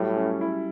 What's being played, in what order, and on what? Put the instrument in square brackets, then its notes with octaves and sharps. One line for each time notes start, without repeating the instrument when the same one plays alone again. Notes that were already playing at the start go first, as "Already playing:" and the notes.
Already playing: [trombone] A2 [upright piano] F#3 G3
[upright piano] C#4
E4